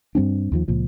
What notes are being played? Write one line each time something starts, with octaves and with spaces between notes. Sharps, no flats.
G2 G3 C4 D4
D#2 D#3 F3
C#2 A#2 F3